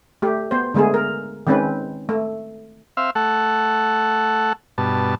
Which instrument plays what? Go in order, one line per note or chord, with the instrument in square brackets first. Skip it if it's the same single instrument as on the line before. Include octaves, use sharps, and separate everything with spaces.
[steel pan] A3 G4
B3 C5
D3 G#3 A3 B3 G#4
A#4
D#3 G#3 C4 C#4 B4
A3
[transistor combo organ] C4 E5 F5
A3 A4 F#5
G2 B2 A5